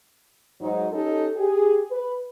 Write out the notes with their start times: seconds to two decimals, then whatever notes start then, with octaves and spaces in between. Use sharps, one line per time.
0.61 G#2 F#3 D#4
0.93 C#4 D#4 G4 A4
1.36 G4 G#4
1.92 B4